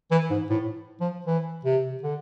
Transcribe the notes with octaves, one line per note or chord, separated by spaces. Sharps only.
E3
G#2
A2
F3
E3
C3
D3